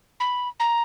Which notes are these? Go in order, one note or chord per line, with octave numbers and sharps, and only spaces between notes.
B5
A#5